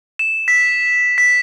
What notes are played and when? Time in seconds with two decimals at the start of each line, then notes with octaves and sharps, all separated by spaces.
0.19 E7
0.48 B6
1.18 B6